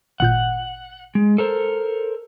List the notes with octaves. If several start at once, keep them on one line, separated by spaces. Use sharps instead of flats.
G#1 A#2 F#5 G6
G#3
A4 A#4 C5